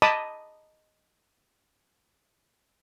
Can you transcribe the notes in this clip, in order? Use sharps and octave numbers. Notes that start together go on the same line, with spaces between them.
D#5 A5 B5 D6 D#6